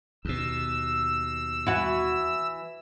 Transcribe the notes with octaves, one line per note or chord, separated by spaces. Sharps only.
D#2 B2 E6
E3 F#4